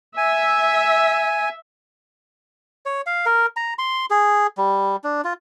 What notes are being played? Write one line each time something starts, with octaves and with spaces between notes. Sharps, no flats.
E5 G#5
C#5
F5
A#4
A#5
C6
G#4
G3
D4
F4